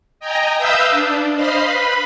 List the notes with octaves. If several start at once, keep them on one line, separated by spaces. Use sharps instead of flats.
D#5 G5 G#5 A#5
B4 E5 F5 D#6 E6 G6
D4
C5 D#5 F5 B5 C6
B4 B5